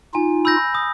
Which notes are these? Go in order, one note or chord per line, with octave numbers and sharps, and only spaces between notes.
D#4 F4 G#5
B5 E6 G6 A#6
D#6